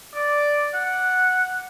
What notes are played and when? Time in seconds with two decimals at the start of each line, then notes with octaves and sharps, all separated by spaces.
0.15 D5
0.74 F#5